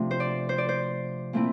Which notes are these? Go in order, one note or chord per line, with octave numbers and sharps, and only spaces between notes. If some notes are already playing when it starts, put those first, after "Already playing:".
Already playing: C3 F3 A3 D4
C5
D5
C5
D5
C5
A#2 A3 C4 E4